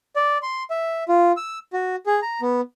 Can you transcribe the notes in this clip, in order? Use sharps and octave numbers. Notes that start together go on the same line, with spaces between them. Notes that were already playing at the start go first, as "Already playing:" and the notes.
D5
C6
E5
F4
E6
F#4
G#4
A#5
B3